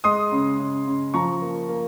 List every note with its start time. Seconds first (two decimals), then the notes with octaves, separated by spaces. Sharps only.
0.04 G#3 C6 D#6
0.32 C#3
0.59 C#3
0.87 C#3
1.14 F3 A#5 C#6
1.42 A#3
1.69 A#3